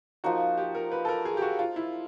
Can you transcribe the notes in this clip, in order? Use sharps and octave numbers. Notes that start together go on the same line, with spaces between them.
F3 A#3 D#4 F#4
G4
A#4
B4
A4
A#4
G#4
G4
F#4
F4
E4